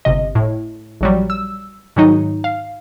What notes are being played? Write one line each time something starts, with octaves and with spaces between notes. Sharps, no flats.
G1 C3 D#5
A2
A#1 F#3 G3
E6
G#2 D#3 F#3 D#4
F5